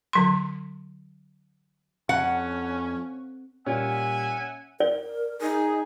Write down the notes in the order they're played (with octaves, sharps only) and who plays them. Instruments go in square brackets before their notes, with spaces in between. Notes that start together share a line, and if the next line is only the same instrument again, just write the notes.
[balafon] D3 F#3 C6
[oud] F2 [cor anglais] C#4 [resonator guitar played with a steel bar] F#5
[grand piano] A#2 G3 [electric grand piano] C#4 [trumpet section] E5 F#5 G#5
[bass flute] A#4 [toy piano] D5
[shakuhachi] D#4 [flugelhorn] G#4